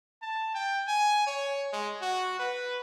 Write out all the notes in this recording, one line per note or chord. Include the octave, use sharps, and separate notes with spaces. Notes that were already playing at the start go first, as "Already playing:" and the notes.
A5
G5
G#5
C#5
G#3
F#4
B4